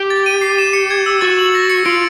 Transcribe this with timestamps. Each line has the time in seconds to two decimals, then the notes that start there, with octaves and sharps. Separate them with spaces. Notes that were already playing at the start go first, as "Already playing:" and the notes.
Already playing: G4
0.10 A6
0.26 D#7
0.41 C7
0.58 E7
0.73 C#7
0.91 G#6
1.06 E6
1.21 F#4 A6
1.39 F#7
1.55 A#6
1.70 C#7
1.85 F4 D7